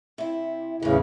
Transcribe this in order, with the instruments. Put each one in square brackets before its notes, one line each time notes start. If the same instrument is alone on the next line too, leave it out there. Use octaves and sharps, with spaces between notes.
[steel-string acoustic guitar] C3 E4
[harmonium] E2 C#3 [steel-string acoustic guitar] A2 E3